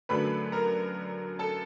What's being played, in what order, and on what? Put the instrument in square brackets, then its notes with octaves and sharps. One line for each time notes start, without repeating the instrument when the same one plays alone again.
[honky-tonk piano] F#2 D3 F#3 A3 B4 B5
A#4 A#5
A4 A5